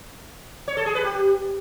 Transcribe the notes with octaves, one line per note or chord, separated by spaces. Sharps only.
C#5
A4
G#4
B4
G4